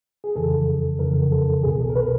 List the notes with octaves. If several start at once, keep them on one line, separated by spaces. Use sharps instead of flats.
G#4
F2 C#3 E3 A4
F2 C#3 E3 A#4
A4
C2 B2 G#4
A4
A#4
B4